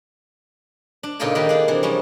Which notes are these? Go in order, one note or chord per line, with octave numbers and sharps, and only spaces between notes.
D4
A#2 C#3 D#4 F4 A4 G#5
D#3 A#3 D#4 G4 B4
D4 G#4
C3 E3
F3 G3 G#3 C#4